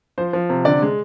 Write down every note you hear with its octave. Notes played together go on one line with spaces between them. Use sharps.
F3 C5
F3
C3
D3 D5
G#3